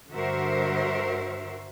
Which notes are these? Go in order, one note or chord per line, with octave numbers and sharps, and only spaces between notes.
G2 D3 F#4 A#4 C5 E5